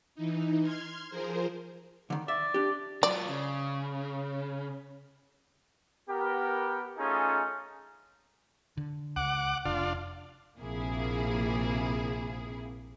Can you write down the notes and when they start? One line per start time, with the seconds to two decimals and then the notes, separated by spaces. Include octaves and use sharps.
0.15 E3 D#4
0.63 C6 F6 G#6
1.10 F3 G#4 A#4 C5
2.10 D3 D#3
2.28 D5 E5
2.54 D4 G4
3.03 F#3 F4 D5
3.29 C#3
6.09 B3 G4 A#4
6.98 A3 C#4 D#4 F4 G#4 A4
8.77 D3
9.16 C#2 F#5 D6
9.65 F1 D4 F4
10.59 A#1 C3 A#3 E4 G#4